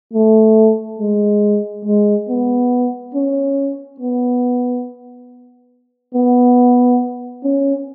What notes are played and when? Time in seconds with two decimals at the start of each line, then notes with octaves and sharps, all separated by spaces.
0.13 A3
0.99 G#3
1.85 G#3
2.29 B3
3.15 C#4
4.00 B3
6.15 B3
7.44 C#4